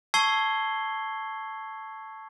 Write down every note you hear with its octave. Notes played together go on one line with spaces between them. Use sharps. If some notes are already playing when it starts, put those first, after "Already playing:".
A5 C#6 E6 G#6 C7 G7